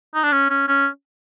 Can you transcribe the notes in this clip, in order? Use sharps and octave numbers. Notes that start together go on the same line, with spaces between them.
D#4
D4
C#4
C#4
C#4